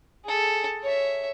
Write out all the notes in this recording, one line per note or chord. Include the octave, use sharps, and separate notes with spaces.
G#4 A4
C#5 E5